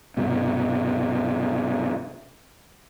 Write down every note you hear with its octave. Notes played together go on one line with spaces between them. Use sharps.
C2 G2 B2